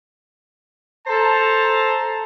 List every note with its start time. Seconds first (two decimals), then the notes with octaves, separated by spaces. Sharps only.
1.07 A4 C5 A5 A#5